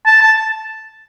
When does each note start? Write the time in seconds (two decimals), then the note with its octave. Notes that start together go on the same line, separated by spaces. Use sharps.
0.07 A5
0.22 A5